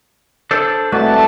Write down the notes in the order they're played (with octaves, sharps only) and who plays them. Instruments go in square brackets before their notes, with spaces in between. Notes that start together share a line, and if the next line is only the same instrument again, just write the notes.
[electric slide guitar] D4 A4 C5
[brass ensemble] C2 A3 A5 [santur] F#3 D5 [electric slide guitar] G#3 F#4 B4